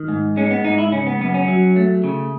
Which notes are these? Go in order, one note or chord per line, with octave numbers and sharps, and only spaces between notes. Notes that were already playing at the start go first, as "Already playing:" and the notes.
Already playing: D#3
G#2
G#3 C#4
B3
G#2 D#4
E4
C#3 C#4
B3
F#2 B3
C#4
F#3
A3
C#3